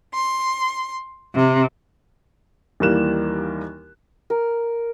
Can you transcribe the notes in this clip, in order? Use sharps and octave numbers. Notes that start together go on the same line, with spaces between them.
C6
C3
D#2 E3 G3 A#3 F#6 E7
A#4